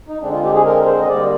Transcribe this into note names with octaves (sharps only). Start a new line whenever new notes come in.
D#4
D3 G#3 C4 D4
F4
G4
G#4
A#4
C5
D#5
D3 G3 A#3 D5